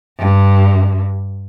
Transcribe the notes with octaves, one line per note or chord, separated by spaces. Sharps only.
G2